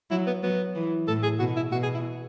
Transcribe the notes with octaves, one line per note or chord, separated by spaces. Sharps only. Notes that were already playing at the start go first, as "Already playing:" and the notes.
F#3 E4
B3
F#3 B3
E3
A2 A4
G#4
B2 F#4
E4
B2 F#4
G#4
E4